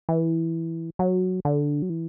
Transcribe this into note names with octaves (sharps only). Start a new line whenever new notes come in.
E3
F#3
D3
F#3
E3